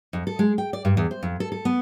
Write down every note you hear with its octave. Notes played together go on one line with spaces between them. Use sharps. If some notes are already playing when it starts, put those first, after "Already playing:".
F2
A4
G#3
G5
D5
G2
E2
C5
F2
A4
A4
B3